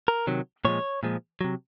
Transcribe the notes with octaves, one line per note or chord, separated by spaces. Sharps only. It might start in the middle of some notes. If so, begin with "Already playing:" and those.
A#4
C3 D#3 F#3
A#2 F3 G#3 C#5
A#2 F3 G#3
C3 F#3